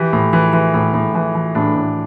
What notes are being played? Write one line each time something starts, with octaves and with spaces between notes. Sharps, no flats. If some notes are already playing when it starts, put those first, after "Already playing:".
Already playing: E3 G4
A2
E3
E3
A2
A2
E3
E3
A2 D4
A2